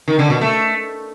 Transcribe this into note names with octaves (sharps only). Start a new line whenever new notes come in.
D#3
D3
B2
A3